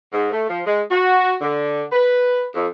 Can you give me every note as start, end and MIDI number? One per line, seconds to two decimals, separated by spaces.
0.13 0.31 44
0.32 0.47 57
0.48 0.60 53
0.66 0.81 56
0.90 1.34 66
1.41 1.82 50
1.91 2.43 71
2.55 2.67 41